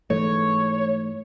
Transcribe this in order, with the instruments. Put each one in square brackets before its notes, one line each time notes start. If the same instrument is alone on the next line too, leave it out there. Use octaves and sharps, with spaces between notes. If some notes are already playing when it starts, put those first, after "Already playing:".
[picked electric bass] G#2 E3 A3 [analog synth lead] C#5